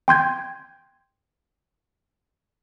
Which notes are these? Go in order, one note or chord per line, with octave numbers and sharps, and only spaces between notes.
G5 C6 G6 G#6